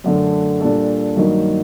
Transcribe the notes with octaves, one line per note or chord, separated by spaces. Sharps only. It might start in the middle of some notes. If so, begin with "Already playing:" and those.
F#2 D3 A3
A#2 G3 D4 A4
G2 D#3 F#3 A#3 D#4